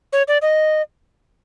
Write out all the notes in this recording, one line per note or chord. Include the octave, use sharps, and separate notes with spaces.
C#5
D5
D#5